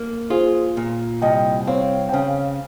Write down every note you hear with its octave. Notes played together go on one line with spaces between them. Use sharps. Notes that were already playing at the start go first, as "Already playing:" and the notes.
Already playing: A#3
F4 G#4 C5
A#2
C2 D#5 G5
G5
C4 C#5 F5
G5
C#3 C#5 F5